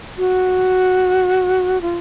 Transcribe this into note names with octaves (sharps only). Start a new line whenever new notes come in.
F#4
F4